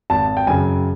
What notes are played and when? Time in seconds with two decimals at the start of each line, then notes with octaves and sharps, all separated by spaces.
0.10 G#1 A5
0.37 G5
0.47 F#2 C#3 G#5